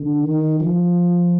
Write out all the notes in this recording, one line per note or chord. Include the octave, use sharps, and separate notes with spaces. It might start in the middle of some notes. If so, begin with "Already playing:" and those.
Already playing: D3
D#3
F3